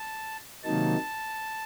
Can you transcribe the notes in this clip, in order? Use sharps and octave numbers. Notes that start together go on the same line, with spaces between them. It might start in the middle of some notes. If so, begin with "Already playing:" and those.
Already playing: A5
C3 D#3 F#3 A#3 D#4 A5